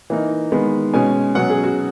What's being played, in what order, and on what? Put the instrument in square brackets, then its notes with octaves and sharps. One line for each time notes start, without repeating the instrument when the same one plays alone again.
[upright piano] E3 A#3 D#4
D#3 G#3 B3
B2 G#3 C#4 G#5
B2 F#3 C#4 F#5
G#4
F#4